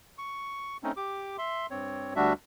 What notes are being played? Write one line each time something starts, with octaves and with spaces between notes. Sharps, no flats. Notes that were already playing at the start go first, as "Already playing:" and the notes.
C#6
A3 C4 C#4 D#4
G4 D6
E5 C6
G2 C4 C#5
D2 G3 D4 F#4 E5